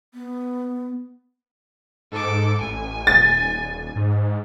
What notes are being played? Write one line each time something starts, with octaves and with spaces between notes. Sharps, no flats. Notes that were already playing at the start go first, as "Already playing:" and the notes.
B3
G#2 A4 D6
A1 G#5
D#1 A6
G#2